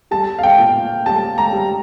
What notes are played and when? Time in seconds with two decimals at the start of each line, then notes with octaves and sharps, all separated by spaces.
0.11 G3 A5
0.39 F5
0.43 G5
0.58 A#2
1.06 G3 A5
1.38 A#5
1.53 G3